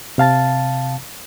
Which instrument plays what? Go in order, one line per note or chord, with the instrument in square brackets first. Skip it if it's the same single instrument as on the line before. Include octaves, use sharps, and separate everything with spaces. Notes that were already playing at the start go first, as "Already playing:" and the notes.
[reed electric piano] C3 F5 A5 A6